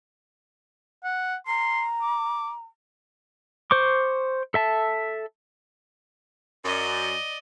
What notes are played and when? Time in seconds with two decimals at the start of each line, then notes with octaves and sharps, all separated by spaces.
1.04 F#5
1.47 A#5 C6
2.02 D6
3.71 C5 C#6 D6
4.54 A4 E5 A5
6.65 F#2 D5 D#5